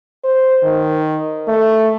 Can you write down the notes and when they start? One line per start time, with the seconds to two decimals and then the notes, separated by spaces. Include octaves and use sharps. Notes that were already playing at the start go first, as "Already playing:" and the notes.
0.24 C5
0.64 D#3
1.48 A3